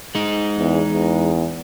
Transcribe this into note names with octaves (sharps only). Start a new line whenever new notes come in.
G#3 D#4
E2
E2